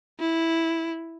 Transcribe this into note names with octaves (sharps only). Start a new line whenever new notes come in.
E4